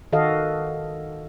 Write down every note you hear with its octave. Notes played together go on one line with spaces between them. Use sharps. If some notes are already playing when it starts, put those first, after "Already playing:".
D#3 F#4 A4 D#5 F5